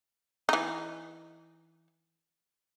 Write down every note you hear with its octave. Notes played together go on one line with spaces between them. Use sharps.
E3 D#4